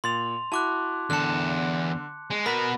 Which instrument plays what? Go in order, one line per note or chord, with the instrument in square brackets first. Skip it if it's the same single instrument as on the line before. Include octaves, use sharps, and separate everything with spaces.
[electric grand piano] A#2 A6 [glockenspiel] C6 F7
[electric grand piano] E4 F#4 [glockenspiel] A5 D6 F#6
[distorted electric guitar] E2 A5 [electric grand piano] D3 [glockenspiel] F#6 C#7
[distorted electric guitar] G#3
[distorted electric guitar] B3 F#4 [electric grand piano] A#4 B6 [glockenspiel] B5